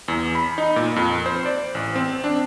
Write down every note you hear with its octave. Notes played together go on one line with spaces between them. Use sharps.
E2
B5
D#4
A#2
F2
C5
D5
A1
C4
D4